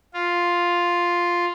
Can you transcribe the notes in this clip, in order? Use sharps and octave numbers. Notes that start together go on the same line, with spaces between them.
F4